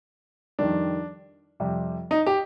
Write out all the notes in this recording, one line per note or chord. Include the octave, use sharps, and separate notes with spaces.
F2 D#3 G3 D4
F2 C3 G3
D#4
G4